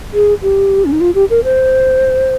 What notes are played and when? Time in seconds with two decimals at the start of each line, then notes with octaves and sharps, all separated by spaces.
0.14 G#4
0.42 G4
0.85 C#4
0.92 D#4
1.01 F4
1.15 G4
1.30 A#4
1.44 C5